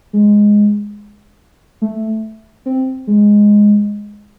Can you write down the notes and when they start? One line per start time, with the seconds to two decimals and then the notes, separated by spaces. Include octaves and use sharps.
0.13 G#3
1.82 A3
2.66 C4
3.07 G#3